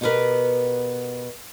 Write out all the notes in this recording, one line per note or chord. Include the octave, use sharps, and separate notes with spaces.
B2 B3 G4 G#4 A#4 B4